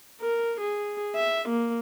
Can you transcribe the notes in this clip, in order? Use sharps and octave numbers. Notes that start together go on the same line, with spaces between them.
A#4
G#4
E5
A#3